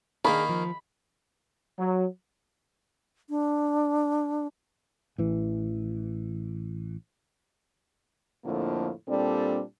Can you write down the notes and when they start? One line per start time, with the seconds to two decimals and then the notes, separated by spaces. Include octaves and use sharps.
0.25 D#3 A#3 D4 G#4 B5
0.49 F3
1.79 F#3
3.30 D4
5.18 A1 E3
8.44 F2 A2 D3 F3 A#3
9.08 A#2 G3 C4 D4 A4